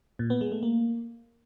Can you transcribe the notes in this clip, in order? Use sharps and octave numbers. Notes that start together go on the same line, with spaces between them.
A#2
B3
G#3
A3
A#3